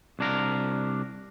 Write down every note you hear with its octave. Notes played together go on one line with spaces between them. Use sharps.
C2 D4 A#4